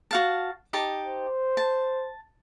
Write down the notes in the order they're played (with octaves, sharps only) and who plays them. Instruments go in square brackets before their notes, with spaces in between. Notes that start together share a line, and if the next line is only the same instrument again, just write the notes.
[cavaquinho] F#4 F5 A5
D#4 G4 A5
[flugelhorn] C5
[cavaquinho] A5